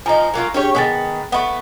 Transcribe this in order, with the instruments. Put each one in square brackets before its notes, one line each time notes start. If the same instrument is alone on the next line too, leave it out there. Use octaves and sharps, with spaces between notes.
[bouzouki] F3 D#4 [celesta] G#5 A#5
[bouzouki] F#3 A#3 F4
[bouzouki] C#4 G4 C#5 [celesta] D4 G#4
[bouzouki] D#3 G3 B3 [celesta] G#4 G#5 A6
[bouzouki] A3 B3 [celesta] F#5 B5 C#6